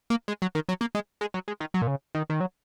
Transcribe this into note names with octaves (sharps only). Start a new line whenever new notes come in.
A#3
G#3
F#3
D#3
F#3
A#3
G#3
G#3
F#3
G#3
D#3
F#3
A#2
C#3
D#3
D#3
F#3